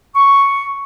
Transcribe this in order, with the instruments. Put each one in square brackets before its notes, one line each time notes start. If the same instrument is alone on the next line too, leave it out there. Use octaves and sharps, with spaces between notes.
[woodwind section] C#6